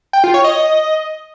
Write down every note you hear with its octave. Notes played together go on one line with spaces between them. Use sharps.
G5
F4
C#5
D#5